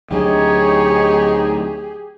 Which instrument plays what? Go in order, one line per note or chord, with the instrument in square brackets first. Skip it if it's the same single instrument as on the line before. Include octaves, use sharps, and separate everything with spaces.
[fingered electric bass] D2 F#3 D4 [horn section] D#4 [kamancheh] G4 G#4 [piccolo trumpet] C#5